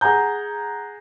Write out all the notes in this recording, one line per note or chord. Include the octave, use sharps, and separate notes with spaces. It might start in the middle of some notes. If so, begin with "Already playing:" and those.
G#4 F#5 G#5 A#5 G6